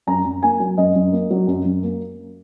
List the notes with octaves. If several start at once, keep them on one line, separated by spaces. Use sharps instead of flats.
F#2 A#5
F#2
A#3 G#5
F#3
F#2 D#5
F#2
A#3
F#3
F#2
F#2
A#3